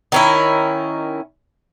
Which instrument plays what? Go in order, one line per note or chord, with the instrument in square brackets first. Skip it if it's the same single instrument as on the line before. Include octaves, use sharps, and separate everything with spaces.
[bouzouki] D#3 C#4 E4